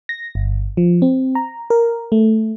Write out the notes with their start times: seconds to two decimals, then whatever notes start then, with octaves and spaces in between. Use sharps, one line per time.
0.09 A#6
0.35 G1
0.77 F3
1.02 C4
1.35 A#5
1.70 A#4
2.12 A3